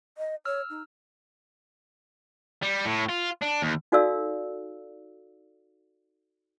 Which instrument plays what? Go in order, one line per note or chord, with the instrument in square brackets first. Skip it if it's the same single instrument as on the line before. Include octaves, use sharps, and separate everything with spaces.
[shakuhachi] D#5
[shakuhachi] C#5 [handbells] E6 F6
[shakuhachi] D#4
[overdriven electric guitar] G3
A2
F4
D4
D#2
[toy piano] D#4 F#4 A4 D5 F5 E6